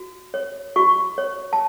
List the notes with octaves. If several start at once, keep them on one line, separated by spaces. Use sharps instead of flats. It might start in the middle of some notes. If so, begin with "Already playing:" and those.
Already playing: F#4
C#5
F#4 C#6
C#5
A5